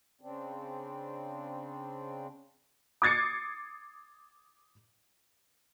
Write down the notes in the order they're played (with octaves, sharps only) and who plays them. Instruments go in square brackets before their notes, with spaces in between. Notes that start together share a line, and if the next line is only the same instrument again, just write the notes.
[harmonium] C#3 C4 D4
[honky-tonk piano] D6 D#6 G#6 A6 C7 C#7